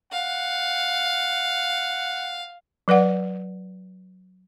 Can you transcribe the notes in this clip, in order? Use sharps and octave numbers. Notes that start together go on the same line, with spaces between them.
F5 F#5
F#3 B4 D5 F#5